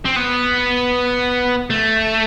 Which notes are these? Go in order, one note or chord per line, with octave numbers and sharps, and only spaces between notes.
C4
B3
A3